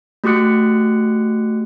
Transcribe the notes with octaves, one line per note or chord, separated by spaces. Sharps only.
A3 F#4 G4 D6 F#6 C#7